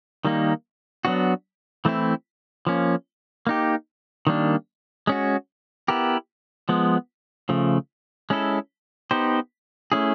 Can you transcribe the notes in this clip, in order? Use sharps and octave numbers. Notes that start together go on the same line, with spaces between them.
D#3 G3 A#3 D#4
F#3 B3 D4 F#4
E3 A3 C4 E4
F3 A#3 C#4
A#3 D#4 G4
D#3 G3 A#3 D4
G#3 C#4 F#4
B3 E4 G4 A#4
F3 G#3 B3
C#3 F3 A3
G#3 C#4 E4 A4
B3 D#4 G4 C5
A3 C#4 E4 G#4